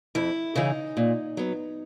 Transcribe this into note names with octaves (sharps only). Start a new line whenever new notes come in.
F2 E4
C#3 E3 D#4
A#2
F#3 B3